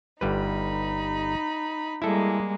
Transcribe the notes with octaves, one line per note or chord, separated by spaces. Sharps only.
G1 G3 D#4 B4 B5
G3 G#3 A#3 E4 A4